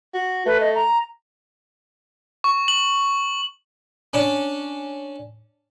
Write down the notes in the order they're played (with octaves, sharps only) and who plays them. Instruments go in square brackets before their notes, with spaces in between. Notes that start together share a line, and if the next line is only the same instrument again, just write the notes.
[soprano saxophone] F#4
[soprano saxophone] A3 [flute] B4
[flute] D#5
A#5
[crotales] C#6
F#7
[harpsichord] C#4 D4